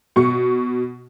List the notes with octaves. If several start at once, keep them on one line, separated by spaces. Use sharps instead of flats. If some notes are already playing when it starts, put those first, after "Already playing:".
B2 C#6